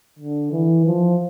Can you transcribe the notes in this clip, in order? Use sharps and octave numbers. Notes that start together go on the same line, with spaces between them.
D3
E3
F3